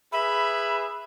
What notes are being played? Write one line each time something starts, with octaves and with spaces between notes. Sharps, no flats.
G#4 B4 E5 B5